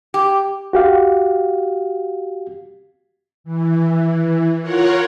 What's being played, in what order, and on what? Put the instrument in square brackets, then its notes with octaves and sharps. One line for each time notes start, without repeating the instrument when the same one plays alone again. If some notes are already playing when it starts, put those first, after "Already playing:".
[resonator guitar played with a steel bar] G4
[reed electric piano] F#4 G4 F5
[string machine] E3
F4 A#4 C#5 F#5